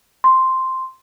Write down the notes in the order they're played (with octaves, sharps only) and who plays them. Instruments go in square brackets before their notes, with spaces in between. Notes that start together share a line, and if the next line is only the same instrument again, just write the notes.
[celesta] C6